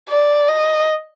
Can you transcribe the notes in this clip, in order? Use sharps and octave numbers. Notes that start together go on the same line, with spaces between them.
D5
D#5